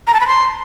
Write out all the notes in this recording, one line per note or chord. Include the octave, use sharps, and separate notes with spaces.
A#5
A5
B5
C6